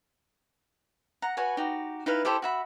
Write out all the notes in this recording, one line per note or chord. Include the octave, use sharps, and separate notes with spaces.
F#5 A#5
F#4 B4 C#5 G#5
D#4 F#4 G4
D#4 E4 B4 F5
E4 G4 A4 C5
F#4 E5 B5